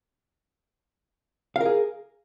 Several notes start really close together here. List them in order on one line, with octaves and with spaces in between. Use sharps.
F5 A#4 G#4